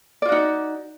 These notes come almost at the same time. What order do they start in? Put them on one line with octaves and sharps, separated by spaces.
D5 F4 F#4 D#4